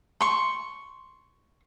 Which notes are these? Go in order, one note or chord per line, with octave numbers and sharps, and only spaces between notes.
C6 C#6